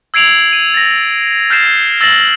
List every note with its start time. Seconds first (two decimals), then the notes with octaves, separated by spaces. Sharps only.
0.14 E6 G#6 C7 D7 F7 F#7
0.53 D#7
0.74 A6 A#6
1.50 F6 G6 A6 C7 E7
2.01 E6 A6 A#6 E7 F#7